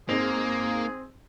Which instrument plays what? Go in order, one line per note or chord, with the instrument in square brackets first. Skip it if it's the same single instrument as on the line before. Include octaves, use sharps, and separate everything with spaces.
[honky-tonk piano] G#2 D#4 F7 [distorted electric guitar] A#3 [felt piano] C4 [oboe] G#4